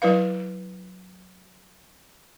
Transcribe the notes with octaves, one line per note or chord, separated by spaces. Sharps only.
F#3 E4 B4 F5